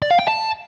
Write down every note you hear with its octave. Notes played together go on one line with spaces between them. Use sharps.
D5
F5
G5
A5